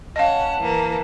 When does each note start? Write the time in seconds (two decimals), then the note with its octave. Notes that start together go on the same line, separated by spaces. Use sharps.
0.16 C#4 D#5 F5 F#5 A5
0.59 E3 A#3